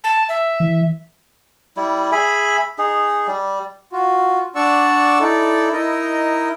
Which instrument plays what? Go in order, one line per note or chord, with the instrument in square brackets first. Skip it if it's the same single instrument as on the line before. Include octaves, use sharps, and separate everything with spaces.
[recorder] A5
E5
[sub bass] E3
[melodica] G3 E4
G#4 E5 G#5 B5
D#4 G#4
G3
[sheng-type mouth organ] F4 F#4
D4 D5 F#5 C#6 E6
D#4 E4 A4 D5
D#4 E4 A#4 D#5